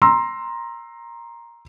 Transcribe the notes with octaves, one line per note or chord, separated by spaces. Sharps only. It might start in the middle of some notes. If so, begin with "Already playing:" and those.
A#5 C6 E6